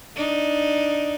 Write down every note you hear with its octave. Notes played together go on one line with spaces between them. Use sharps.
D4 D#4